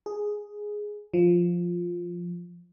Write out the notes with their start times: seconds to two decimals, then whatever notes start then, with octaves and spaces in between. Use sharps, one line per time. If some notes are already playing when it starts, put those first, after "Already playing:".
0.06 G#4
1.14 F3